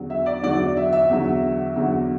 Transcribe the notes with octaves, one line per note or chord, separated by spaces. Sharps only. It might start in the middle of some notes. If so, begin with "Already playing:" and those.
Already playing: E2 D3 F#3
E5
D5
E2 D3 F#3 D5
D5
E5
E5
E2 D3 F#3
E2 D3 F#3